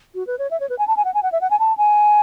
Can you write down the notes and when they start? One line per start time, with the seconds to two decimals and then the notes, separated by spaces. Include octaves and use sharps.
0.15 F#4
0.27 B4
0.39 C#5
0.51 E5
0.60 C#5
0.69 B4
0.78 G#5
0.88 A5
0.97 G#5
1.05 F#5
1.14 G#5
1.23 F#5
1.32 E5
1.41 F#5
1.51 G#5
1.59 A5
1.77 G#5